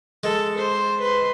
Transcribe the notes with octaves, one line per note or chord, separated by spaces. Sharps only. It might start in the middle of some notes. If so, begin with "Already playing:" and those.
G#3 A4
C5
B4 C6